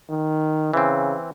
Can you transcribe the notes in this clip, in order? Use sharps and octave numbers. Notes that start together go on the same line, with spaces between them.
D#3
C#3 E3 C4